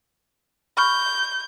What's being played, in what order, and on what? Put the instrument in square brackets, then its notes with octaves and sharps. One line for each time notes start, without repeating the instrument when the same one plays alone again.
[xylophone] B5 C#6 F6 [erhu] G6